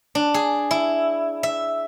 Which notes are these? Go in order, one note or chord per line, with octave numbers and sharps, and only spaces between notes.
D4
G#4
E4
E5